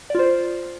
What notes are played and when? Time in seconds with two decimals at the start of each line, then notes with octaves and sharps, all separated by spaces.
0.10 D5
0.15 F4
0.19 C5